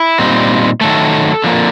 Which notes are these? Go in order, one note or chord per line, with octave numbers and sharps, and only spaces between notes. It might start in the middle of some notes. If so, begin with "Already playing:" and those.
Already playing: E4
A#2 G3 C4 D#4
D#3 F#3 A3 A4
D3 F3 A#3